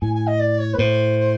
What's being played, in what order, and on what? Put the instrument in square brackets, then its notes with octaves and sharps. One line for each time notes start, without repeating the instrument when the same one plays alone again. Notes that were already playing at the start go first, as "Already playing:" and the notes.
[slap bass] A2 [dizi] G#5
[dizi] G#5
D#5
D5
C#5
B4
[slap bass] A2 [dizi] C5